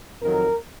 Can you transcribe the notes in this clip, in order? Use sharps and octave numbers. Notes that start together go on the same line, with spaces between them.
F2 D#3 F#3 A#4